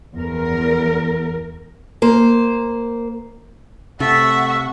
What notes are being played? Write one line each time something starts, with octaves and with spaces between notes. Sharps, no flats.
E2 A#4
A#3 C5
C3 A3 E5 F#5 C#6